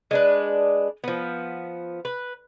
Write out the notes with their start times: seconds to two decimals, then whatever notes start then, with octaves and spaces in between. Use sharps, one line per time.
0.11 G#3 D4 B4
1.04 F3 B3
2.05 B4